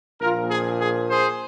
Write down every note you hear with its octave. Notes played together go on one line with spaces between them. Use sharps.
A#1 A#2 F3 F4 A#4
G#4
G#4
G#4 C5